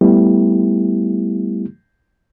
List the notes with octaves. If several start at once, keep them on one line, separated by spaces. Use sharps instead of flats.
G3 A3 B3 E4 G4